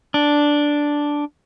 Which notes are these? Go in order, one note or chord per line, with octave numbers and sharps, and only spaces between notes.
D4